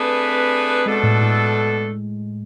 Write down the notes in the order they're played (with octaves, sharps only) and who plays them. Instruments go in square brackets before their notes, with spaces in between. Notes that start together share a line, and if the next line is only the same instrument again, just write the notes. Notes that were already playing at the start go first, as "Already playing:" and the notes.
Already playing: [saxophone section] A3 D4 G#4 B4 [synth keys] C4
[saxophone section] B2 A3 D4 A4 [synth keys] G#3
[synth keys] A2
A2